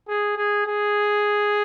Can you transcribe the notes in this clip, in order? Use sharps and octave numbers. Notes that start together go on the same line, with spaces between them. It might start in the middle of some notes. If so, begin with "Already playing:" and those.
G#4
G#4
G#4